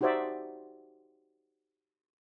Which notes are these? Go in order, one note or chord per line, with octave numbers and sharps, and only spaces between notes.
D#4 F#4 G4 C5 D5 E5